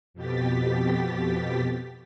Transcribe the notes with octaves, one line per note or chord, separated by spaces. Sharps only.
F2 B2 G4 A6 B6